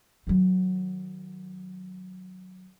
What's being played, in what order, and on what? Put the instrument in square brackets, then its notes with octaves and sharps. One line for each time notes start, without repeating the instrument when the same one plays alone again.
[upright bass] D#3 F#3